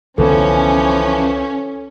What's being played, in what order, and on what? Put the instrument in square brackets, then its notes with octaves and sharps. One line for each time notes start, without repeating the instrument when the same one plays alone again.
[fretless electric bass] C2 D3 B3 [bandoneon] E3 F3 [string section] C#4 [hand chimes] A4